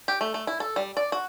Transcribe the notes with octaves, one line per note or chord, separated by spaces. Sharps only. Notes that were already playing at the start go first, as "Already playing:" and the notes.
G4
A3
A3
E4
A4
G3
D5
F#4